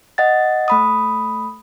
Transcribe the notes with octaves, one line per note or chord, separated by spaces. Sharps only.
D#5 F#5 A6
A3 B5 D#6